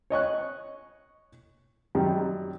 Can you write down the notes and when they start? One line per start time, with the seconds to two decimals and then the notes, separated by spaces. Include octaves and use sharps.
0.10 C#5 D#5 C#6 F#6
1.95 F#2 D#3 G3